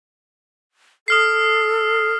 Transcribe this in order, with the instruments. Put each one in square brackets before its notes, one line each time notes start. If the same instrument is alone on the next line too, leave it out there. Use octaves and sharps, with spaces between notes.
[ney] A4 [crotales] D#6 F6 C7